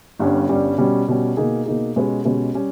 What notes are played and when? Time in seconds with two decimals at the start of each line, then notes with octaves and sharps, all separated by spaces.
0.19 G1 G2 G3 C#4
0.49 G1 G2 G3 C#4
0.78 B2 G3 C#4
1.08 B2 G3 C#4
1.37 B2 A#3 D#4 G#4
1.66 B2 A#3 D#4 G#4
1.96 B2 G#3 C#4 G4 B4
2.25 B2 G#3 C#4 G4 B4
2.54 G3 C#4 G4